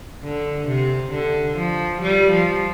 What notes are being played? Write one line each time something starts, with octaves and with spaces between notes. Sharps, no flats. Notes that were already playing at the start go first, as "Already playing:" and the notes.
D3
C3
D3
F3
G3
F3